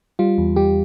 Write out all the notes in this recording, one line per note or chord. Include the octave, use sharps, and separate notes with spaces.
G3 F4
E2
G3 G4